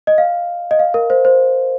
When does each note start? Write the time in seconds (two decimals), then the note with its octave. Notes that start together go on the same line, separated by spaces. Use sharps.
0.07 D#5
0.18 F5
0.71 D#5
0.79 F5
0.94 A#4
1.10 C5
1.25 C5